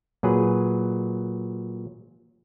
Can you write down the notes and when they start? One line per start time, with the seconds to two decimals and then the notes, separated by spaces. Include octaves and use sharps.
0.23 A#2 F#3 G#4 B4